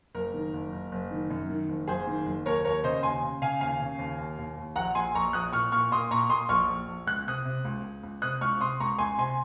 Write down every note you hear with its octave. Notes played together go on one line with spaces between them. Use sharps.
F#1 A#4
D#3
F#1
F#1
F#1
D#3
F#2
D#3
F#1
F#1 G#4 C5
D#3
F#1
D#2 A#4 C#5
D#2 A#4 C#5
C#3 C5 D#5
D#2 G#5 C6
C#3
C#3 F5 G#5
D#2 F5 G#5
C#3
D#2
D#2
D#2
D#2
A#1 F#5 A#5
A#1 G#5 C6
A#1 A#5 C#6
A#1 D#6 F#6
A#2 C#6 F6
A#2 C#6 F6
A#2 C6 D#6
A#2 A#5 C#6
A#2 C6 D#6
A#1 C#6 F6
A#1
A#1
C#2 F#6
C3 D#6 F#6
C3
C#2
C#2
C#2
C3 D#6 F#6
C#2 C#6 F6
C3 C6 D#6
C#2 A#5 C#6
C#2 G#5 C6
C3 G#5 C6